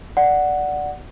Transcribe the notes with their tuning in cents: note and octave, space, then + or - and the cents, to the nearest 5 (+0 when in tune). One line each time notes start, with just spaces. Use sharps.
D5 +0 F#5 +0